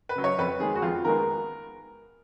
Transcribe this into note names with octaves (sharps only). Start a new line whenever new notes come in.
B4
C#3 F#3
C#5
F2 B4
D#3 G#3 B3 G#4
F#4
F2 F4
D#3 G#3 B3 A#4